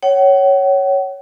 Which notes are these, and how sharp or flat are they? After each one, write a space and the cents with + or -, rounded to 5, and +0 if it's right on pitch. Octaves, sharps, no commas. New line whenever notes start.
C#5 +0 F#5 +40